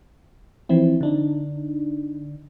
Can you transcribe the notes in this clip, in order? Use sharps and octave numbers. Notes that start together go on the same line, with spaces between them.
E3 F3 C4 E4
D3 D4 D#4